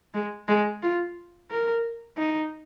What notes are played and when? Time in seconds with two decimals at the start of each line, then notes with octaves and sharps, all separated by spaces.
0.14 G#3
0.48 G#3
0.83 F4
1.51 A#4
2.18 D#4